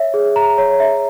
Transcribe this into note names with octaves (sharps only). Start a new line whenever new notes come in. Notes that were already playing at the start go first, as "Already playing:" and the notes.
Already playing: C#5 E5
G#4
A#5
C#5
E5